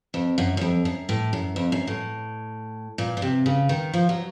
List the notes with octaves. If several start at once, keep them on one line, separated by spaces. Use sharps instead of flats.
F2
F#2
F#2
F2
F#2
A2
F#2
F2
F#2
A2
A#2
A#2
C3
C#3
D#3
F3
F#3